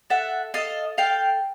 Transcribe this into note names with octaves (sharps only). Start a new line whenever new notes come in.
A4 E5 F#5
A4 D#5 F5
A4 F5 G5